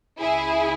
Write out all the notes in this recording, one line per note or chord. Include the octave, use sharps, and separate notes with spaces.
C#2 C#3 G#3 E4 G#4